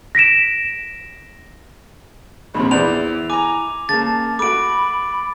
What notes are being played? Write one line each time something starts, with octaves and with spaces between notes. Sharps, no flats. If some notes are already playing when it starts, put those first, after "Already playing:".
A#6 B6 D7 E7
A#1 D#2 C3 B5
E2 E4 C5 D5 F7
G#5 A#5 D6
C#3 A#3 A5 A6
A3 F#4 B5 D6 D7